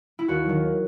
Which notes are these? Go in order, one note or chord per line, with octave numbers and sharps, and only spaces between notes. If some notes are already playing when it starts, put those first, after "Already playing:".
E4
D#2 F#4
D#3 F#3